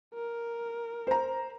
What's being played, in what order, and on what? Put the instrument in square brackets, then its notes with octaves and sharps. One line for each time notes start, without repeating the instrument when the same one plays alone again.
[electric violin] A#4
[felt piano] C5 A#5